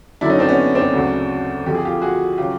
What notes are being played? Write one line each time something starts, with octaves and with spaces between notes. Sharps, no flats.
F#2 D3 F#3 D4 E4
C#4 D#4
C4 D4
B3 C#4
C4 D4
D2 C#3 F#3
F2 D3 F3 G4
G#4
F4 G4
F#4 G#4
C#3 F#3 F4 G4